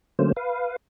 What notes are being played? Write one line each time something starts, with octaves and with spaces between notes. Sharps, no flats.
D3 F#3 A3 A#3 C#4 C5
B4 F5